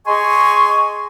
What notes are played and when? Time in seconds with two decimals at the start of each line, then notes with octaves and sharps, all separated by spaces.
0.07 G#4 D#5 G#5 C6 C#6